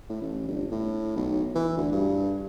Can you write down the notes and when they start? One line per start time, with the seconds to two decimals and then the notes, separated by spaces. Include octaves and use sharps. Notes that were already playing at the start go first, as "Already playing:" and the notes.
0.09 A2
0.21 A1
0.48 G1
0.72 A2
1.16 B1
1.55 E3
1.77 D2
1.92 G2